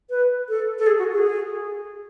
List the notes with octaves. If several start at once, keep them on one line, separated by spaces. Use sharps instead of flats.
B4
A4
A4
G#4
F#4
G#4